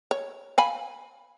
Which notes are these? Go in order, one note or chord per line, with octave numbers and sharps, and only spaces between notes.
C#5
F5 G#5 B5